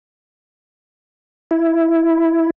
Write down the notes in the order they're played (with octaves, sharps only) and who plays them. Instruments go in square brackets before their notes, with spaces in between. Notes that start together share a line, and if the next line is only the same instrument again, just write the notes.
[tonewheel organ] E4